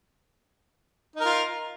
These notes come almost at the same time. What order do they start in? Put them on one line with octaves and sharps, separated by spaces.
D#4 A#4 F4